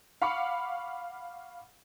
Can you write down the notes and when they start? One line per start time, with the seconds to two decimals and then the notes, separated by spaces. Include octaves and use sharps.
0.22 F5 F#5 B5 C#6 D6 C#7